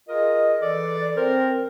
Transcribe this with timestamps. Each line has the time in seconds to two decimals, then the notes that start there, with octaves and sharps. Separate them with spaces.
0.09 F4 G#4 A#4 D#5
0.61 E3 A4 D5
1.16 C4 A#4 C5